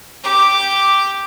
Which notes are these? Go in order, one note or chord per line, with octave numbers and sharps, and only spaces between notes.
G4 D6